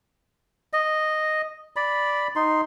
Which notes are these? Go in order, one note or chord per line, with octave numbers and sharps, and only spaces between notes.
D#5
D5 B5
D#4 C6